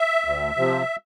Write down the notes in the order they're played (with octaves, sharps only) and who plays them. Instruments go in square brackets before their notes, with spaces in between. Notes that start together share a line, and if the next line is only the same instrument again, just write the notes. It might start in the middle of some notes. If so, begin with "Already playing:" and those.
Already playing: [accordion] E5
D2
C3 F3